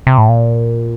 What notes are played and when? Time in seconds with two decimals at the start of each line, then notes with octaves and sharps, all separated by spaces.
0.07 C3
0.18 A2
0.29 A#2